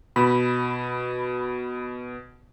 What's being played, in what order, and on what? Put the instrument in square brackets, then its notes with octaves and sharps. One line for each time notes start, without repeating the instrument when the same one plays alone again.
[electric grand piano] B2 [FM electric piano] B5